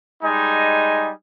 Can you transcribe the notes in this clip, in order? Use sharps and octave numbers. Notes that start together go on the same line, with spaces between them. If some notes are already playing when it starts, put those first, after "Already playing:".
G3 G#3 D#4 D#5 G#5